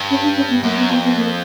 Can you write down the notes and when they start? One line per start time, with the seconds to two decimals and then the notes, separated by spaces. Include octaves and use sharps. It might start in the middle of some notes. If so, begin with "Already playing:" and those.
Already playing: G2
0.10 C#4
0.23 D4
0.37 C#4
0.50 B3
0.63 F#2 A#3
0.77 B3
0.90 F2 B3
1.04 B3
1.17 A#3